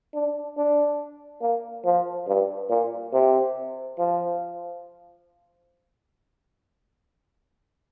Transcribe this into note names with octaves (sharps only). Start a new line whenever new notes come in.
D4
D4
A#3
F3
G2
A#2
C3
F3